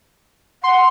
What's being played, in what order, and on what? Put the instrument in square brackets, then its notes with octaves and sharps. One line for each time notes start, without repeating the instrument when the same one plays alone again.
[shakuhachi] F#5 [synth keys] C6